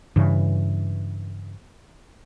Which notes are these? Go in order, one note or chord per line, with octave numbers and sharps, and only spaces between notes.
G2 C#3 E3